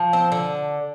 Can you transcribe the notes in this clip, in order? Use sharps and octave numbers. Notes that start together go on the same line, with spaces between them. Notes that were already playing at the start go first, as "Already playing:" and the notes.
Already playing: F3
C4
D3